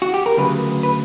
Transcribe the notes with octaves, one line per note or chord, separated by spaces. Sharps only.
F#4
G4
A#4
D2 C#3 F#3 B4
B4